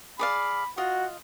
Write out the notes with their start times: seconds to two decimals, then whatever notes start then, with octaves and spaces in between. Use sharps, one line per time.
0.19 G#4 D5 F5 B5
0.77 F4 F#4 D#5